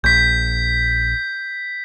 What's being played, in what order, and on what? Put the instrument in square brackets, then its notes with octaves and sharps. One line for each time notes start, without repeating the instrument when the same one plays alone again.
[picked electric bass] A#1 [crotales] G6 B6